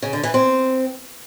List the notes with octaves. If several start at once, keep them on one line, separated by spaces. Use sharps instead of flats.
C#3
D3
E3
C4